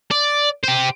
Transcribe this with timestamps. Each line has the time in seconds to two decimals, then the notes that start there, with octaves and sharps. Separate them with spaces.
0.11 D5
0.64 G4 C5